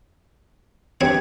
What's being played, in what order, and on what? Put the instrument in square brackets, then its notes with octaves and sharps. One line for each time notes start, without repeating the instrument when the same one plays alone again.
[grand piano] G1 G4 G#6 [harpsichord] C4 C#5